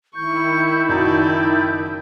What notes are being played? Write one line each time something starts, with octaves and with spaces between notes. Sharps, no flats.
D#3 E4 C#6 G6
F#1 D#4 F#4 D5 A#5